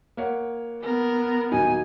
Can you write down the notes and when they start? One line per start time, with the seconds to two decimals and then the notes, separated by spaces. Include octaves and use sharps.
0.17 A#3 C#5 F#5
0.83 B3 A#4
1.52 D#1 F#3 D#4 G#5